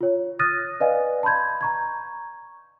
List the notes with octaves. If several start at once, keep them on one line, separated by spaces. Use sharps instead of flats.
F4 C#5
D#6 F6 F#6 A6 A#6 D#7
B4 D5 D#5 F5 G#5
A5 B5 C6 G6 G#6
A#5 C#6 G#6